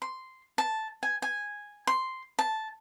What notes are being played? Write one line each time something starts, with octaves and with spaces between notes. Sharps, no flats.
C6
A5
G#5
G#5
C6
A5